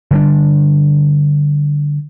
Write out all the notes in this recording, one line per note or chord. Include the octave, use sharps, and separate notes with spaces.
D3 G3 D4